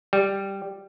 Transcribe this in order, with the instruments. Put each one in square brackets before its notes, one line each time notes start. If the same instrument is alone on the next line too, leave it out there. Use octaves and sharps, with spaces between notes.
[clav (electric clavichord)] G3